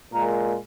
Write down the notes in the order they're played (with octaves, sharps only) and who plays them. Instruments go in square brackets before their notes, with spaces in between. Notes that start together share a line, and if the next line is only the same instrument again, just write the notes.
[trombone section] A#2 G#3 A#4